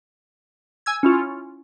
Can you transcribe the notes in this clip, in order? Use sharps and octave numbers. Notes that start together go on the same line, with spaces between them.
G#5 E6 G#6
C#4 E4 F4